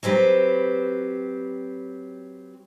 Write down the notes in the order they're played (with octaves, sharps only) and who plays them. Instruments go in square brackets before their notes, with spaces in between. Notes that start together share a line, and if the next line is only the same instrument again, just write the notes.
[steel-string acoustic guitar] F#3 C4 G4 B4